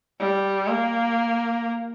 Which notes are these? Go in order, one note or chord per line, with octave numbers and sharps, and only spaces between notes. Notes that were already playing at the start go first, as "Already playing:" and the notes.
G3
A#3